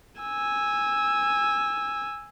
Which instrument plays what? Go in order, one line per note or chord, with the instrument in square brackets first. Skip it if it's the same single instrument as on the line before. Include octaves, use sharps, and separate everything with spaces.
[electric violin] G#5 E6